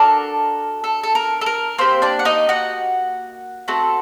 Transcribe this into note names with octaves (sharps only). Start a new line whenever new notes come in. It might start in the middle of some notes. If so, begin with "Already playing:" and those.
Already playing: D4 F#4 A4 A#4
A4
A4
A#4
A4
A#4
A#3 C4 G4 C5
D4 D5
F#5
D#4 D#5
F#4 F#5
A3 C4 F#4 A4